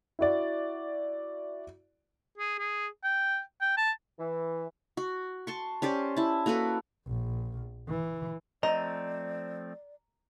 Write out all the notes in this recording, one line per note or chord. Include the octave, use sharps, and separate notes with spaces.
E4 F#4 D5
G#4
G#4
G5
G5
A5
E3
F#4
A5 C6 C#6
C#4 G4 C5 D5
E4 A5
A#3 F#4 A4 B4
A#1
E3
F3 A3 C4 D5 D#5 A#5